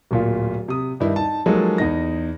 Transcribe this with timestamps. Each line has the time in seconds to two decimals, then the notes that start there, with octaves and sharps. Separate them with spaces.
0.11 D1 A#2 F4
0.68 C3 D#6
1.00 G2 D#3 D#4 E4
1.16 D#4 A5
1.46 F3 F#3 G#3 A#3 D#4 A4
1.78 E2 D#4 A#6